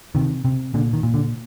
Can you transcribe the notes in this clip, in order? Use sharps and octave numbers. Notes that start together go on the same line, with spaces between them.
C3 D#3
C3
A#2 D3
D#3
A#2
D3